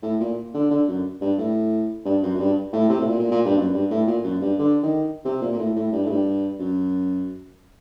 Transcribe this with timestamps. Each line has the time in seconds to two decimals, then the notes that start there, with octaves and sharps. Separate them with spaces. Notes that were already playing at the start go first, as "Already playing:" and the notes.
0.03 A2
0.20 A#2
0.54 D3
0.71 D3
0.88 F#2
1.21 G2
1.38 A2
2.05 G2
2.22 F#2
2.35 F#2
2.39 G2
2.73 A2
2.89 C3
2.99 A2
3.07 A#2
3.19 A#2
3.31 A#2
3.45 G2
3.57 F#2
3.73 G2
3.90 A2
4.07 A#2
4.24 F#2
4.41 G2
4.58 D3
4.83 D#3
5.25 C3
5.41 A#2
5.52 A#2
5.58 A2
5.76 A2
5.92 G2
6.05 A2
6.10 G2
6.59 F#2